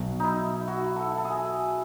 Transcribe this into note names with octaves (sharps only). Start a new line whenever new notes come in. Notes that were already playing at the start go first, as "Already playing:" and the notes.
Already playing: B1 B2 F#3
D#4 E4
F#4
A4
A4
G#4